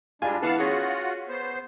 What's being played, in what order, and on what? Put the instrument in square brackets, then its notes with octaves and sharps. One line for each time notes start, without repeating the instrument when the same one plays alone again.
[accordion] G3 G#3 D4 [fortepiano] F4 G#5
[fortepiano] E3 B3 [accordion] F5 F#5 A5
[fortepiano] C#4 G#4 [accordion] F4 F#4 F#5
[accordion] B3 C5